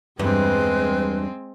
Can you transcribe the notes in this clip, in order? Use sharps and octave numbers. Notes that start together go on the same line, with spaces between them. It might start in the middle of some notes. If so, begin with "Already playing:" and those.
E2 G2 G#3 C4 B4